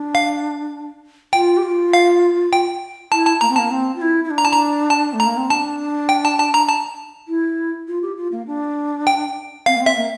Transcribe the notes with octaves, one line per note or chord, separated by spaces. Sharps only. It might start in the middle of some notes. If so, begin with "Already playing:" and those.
Already playing: D4
F5
F4 G5
G4
F4
F5
G5
E4 A5
A5
A#3 A#5
C4
A#3 A5
C4
F4
E4
E4
D4
A#5
A5
A#5
A5
A3
A#5
A#3
C4
D4 A5
G5
A5
A5
A#5
A5
E4
F4
G4
F4
A#3
D4
G5
C4 F5
A#3
C4
E5
A#3